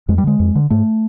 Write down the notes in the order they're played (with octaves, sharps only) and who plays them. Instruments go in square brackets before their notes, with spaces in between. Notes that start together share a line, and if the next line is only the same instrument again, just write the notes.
[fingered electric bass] F2 G#3
G3
D3 G#3
F2
D3
G#2 A3